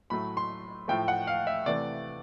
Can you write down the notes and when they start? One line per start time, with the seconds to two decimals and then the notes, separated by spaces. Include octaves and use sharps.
0.10 A2 F#3 A3 B5
0.37 C6
0.88 A2 F3 A3 G5
1.08 F#5
1.27 F5
1.47 E5
1.66 C3 E3 A3 D5